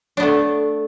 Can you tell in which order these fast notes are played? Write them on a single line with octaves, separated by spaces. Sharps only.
D4 B3 A3